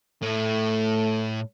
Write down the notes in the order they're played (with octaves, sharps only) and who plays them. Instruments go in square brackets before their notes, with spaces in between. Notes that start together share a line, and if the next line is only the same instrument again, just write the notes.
[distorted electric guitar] A2 [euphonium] A3